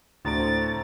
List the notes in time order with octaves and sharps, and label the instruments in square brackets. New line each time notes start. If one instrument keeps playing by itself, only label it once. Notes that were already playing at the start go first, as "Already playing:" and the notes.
[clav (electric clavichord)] D2 D3 [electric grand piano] A2 A#5 D7 [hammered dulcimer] C4 [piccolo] A6